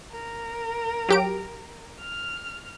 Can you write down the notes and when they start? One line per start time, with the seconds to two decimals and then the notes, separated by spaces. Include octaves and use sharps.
0.12 A#4
1.09 F#3 G4 D7
2.01 F6